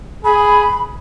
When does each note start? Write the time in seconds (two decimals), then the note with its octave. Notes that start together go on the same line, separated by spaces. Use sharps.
0.25 G#4 B5